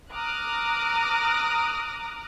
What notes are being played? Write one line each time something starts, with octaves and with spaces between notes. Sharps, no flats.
A#5 D6 D#6 F6 F#6